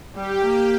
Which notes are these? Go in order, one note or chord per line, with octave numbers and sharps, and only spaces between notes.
G3 G4
A#3